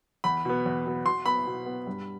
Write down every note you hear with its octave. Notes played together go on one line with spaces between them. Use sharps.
E2 B5
B2 B3
E2
B2 B3
B2 C6
B3 B5
B2
B3
G2